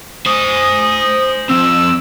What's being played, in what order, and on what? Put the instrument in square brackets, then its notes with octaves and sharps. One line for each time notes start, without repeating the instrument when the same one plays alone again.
[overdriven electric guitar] C5 G#5 [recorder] D#6
[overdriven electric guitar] F3 C4 [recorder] E6